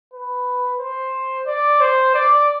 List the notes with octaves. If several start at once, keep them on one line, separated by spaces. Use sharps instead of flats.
B4
C5
D5
C5
D5